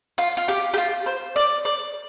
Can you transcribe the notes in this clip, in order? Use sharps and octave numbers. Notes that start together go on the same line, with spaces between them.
F4
F4
G4
G4
F4
C5
D5
D5